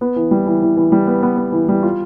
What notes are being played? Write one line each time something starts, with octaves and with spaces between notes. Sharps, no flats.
B3
E3
G3
E3
E3
E3
G3
B3
B3
B3
E3
G3
F4